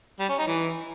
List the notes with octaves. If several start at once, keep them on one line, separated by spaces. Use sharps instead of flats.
G3
C#4
D#4
E3